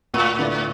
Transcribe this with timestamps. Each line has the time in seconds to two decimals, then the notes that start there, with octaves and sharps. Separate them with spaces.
0.14 D2 A2
0.39 D3 B3 E4 D5